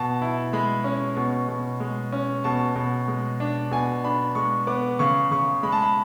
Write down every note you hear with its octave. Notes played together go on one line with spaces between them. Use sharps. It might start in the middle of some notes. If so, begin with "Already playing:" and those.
Already playing: B2 A5
E4
G#3 B5
C#4
B2
B2
G#3
C#4
B2 A5
B2
G#3
D4
B2 G#5
D4 B5
G#3 C#6
B3 D6
C#3 C#6
C#3 C#6
G#3 B5
A5
B5